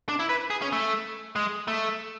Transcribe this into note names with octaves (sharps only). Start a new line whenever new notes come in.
D4
E4
B4
G#4
C#4
A3
G#3
A3